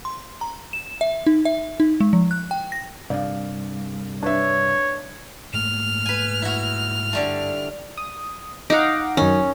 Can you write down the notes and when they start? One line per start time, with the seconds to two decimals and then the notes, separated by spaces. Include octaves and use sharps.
0.05 C6
0.41 A#5
0.73 E7
1.01 E5
1.26 D#4
1.45 E5
1.80 D#4
2.00 G#3
2.13 F3
2.31 F#6
2.51 G5
2.72 A#6
3.10 C2 G2 D5 F5
4.23 D4 B4 C#5 E5
5.53 G#2 A3 A#3 F6
6.06 B4 G#5
6.42 E4 F#4
7.13 G2 D3 G3 A3
7.97 D#6
8.70 D#4 F5 F#5 D6
9.17 F#2 D#3 C#4